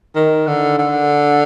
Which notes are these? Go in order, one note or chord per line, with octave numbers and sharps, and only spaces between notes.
D#3
D3
D3